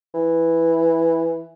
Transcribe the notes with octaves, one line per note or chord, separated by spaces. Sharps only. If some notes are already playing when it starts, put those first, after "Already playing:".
E3